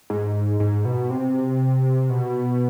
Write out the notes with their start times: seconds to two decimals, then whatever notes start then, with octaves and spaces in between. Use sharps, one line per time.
0.10 G#2
0.60 G#2
0.85 B2
1.10 C3
2.10 B2